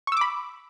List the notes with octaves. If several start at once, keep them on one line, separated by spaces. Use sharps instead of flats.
B5 C#6 D6 E6